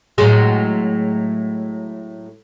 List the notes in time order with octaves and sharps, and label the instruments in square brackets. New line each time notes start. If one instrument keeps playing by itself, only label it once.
[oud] A2 F#3 G#3